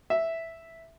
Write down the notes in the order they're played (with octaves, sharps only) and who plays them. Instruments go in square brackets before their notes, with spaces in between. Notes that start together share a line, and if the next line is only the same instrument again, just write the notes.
[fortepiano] E5